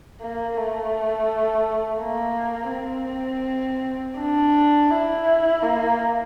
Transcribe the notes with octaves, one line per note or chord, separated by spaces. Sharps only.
A#3
A3
A#3
C4
D4
E4
A#3